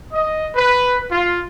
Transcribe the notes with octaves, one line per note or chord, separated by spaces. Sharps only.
D#5
B4
F4